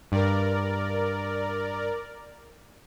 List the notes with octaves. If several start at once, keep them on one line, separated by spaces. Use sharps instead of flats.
G2 A#4 D5